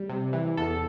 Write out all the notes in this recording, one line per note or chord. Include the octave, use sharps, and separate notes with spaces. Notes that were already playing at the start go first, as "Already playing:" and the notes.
Already playing: G3
C3
E3
E2 A4